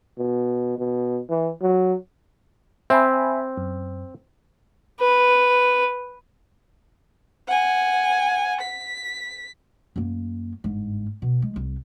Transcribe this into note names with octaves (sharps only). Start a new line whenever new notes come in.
B2
B2
E3
F#3
C4 E5 G#5 B5
F#2
B4
F#5 G#5
B6
F#2 A#3
G1 G#2
B2
G#3
C2